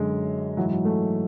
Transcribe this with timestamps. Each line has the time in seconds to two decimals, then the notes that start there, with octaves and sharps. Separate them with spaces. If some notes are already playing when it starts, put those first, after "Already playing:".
Already playing: F#2 D3 G#3
0.57 G#2 E3 F#3
0.71 F#3
0.85 A3